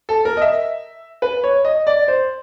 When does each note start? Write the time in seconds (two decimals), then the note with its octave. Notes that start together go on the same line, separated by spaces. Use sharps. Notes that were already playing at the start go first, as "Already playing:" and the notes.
0.09 A4
0.25 A#4
0.37 D#5
0.42 E5
1.22 B4
1.44 C#5
1.65 D#5
1.87 D5
2.08 C5